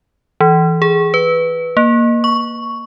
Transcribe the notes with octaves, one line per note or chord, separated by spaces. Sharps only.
E3
G#4
B4
A#3
C#6